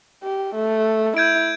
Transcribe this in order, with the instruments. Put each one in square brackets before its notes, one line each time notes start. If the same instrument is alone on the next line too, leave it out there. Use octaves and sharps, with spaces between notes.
[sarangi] G4
A3
[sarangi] E4 [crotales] G6 G#6 D7